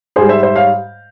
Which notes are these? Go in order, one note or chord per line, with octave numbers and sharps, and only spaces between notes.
G#2 G3 G#4 C5
C5 E5
C5 E5
C#5 F5